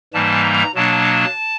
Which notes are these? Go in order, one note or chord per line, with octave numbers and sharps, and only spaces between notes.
G#2 E3 G3 A#3 A5
A#5
B2 F#3 A#3 D4 A5